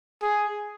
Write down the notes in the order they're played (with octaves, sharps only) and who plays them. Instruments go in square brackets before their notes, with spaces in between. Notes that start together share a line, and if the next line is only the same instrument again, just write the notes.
[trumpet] G#4